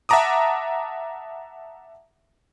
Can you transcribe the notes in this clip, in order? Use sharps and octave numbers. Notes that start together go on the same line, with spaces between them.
E5 F#5 A5 A#5 D6 D#6